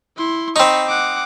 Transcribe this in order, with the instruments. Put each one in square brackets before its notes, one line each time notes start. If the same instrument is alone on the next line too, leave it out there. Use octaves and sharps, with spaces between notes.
[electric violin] E4 C6
[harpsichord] C4 D#4 [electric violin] B5 C#6
[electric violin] F#5 D6